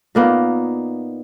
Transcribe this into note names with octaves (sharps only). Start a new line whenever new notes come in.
A#2 A#3 B3 D#4